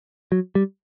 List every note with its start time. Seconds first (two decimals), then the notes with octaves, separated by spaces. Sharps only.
0.32 F#3
0.55 G3